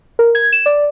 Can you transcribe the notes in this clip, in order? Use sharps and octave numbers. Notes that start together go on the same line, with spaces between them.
A#4
G#6
E7
D5